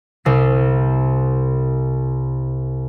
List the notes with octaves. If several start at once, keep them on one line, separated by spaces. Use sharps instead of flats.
C2 C4 C7